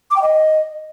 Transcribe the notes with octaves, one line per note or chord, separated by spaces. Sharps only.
D6
G5
D#5